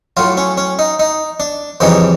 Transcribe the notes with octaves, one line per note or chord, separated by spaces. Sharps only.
A2 F#3 F4
C#4
C#4
D#4
D#4
D4
F2 C#3 E3 G3 D#4